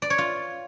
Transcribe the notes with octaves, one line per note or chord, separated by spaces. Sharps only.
D5
C#5
F4